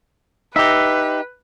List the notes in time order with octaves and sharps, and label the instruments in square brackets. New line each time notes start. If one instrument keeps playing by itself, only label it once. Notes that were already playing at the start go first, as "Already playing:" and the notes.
[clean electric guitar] D#4 G4 [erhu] B4 [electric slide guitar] E5